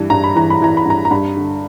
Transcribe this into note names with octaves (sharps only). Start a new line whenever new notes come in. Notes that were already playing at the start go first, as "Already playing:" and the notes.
Already playing: G2 E3
G2 A#5
B5
E3 A#5
B5
E3 A#5
B5
G2 A#5
A#5
G2 B5
D3